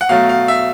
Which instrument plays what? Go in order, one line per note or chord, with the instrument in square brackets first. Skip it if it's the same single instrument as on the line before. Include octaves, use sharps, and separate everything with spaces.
[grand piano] F#5
B2 F#3 A3 F5
F5
E5